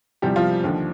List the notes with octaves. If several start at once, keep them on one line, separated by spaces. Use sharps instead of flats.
E2 C3 F3 G3 G4
F3 F4
D#2 D3 F3